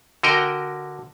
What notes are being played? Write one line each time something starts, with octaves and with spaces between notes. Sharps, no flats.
D3 F#4 A#4 D#5 G5